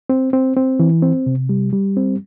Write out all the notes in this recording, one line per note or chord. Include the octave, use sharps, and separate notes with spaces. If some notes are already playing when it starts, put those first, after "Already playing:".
C4
C4
C4
E3
C4
C3
G3
G3
C4